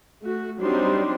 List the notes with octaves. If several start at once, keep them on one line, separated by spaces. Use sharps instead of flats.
A3 F#4
F#3 G3 C4 D4 D#4 C6